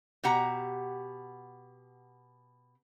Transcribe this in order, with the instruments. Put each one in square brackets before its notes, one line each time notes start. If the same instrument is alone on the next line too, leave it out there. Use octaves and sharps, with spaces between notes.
[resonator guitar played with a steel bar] B2 G4 F#5 A#5